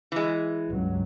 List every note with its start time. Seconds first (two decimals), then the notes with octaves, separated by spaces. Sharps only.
0.12 E3 G#3
0.70 C#2 G2 F#3